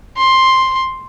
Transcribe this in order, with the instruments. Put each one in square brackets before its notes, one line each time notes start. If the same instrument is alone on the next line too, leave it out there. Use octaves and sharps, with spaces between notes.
[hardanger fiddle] C6